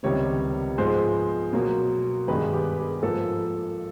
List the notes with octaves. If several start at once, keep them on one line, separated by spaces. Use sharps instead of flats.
C#2 C3 D#3 G3 B3 C#5
G#2 F3 G#3 B3 C5
B2 F#3 A#3
G2 D#3 G#3 B3 B4
G4
G#4
G#2 F3 A#3 A4